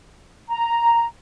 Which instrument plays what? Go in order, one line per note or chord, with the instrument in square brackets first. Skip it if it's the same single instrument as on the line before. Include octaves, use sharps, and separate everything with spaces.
[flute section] A#5